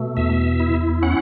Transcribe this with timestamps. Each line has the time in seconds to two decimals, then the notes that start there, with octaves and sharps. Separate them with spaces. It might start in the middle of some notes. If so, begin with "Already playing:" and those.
Already playing: B2 A3
0.17 E2 E5
0.60 E4
1.02 C#4 F#5